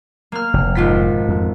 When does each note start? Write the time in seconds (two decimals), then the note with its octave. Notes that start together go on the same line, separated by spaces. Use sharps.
0.32 A#3 F6
0.54 F1
0.75 G#1 F4 B6
1.29 F2